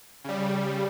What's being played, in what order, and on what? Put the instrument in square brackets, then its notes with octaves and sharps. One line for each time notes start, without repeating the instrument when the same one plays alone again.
[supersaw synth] C#3 G3